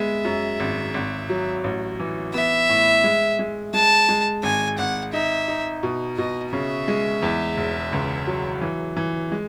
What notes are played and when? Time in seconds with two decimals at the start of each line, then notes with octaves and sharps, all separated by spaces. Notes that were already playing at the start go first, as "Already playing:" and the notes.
Already playing: G#3 B3 E5
0.25 F#2
0.60 G#1
0.94 G#1
1.29 F#3
1.64 A1
2.00 E3
2.34 B3 E5
2.69 A2
3.04 G#3
3.39 G#3
3.74 G#3 A5
4.09 G#3
4.43 G#1 G#5
4.78 G#1 F#5
5.13 D#4 E5
5.48 D#4
5.83 B2
6.17 B2 D#5
6.53 C#3 E5
6.88 G#3
7.23 E2
7.57 E1
7.93 C#2
8.27 F#3
8.61 E3
8.97 E3
9.32 G#3